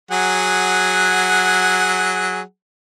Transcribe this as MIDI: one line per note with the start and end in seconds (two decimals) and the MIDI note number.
0.11 2.41 54
0.11 2.41 68
0.11 2.41 78